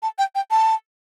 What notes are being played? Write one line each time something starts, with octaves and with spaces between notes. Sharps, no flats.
A5
G5
G5
A5